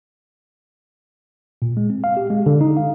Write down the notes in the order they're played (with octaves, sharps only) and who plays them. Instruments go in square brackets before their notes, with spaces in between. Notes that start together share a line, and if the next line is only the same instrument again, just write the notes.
[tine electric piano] A#2
G#3
C4
F5
G4
G#3
D3
D#4
F5